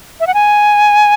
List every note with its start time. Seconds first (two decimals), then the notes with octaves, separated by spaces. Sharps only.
0.20 E5
0.27 F#5
0.34 G#5